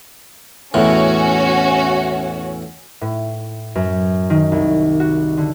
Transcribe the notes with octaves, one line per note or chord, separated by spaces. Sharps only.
E2 A2 C#4 F#4
A2
F#2
D#3
C2
F#4
D3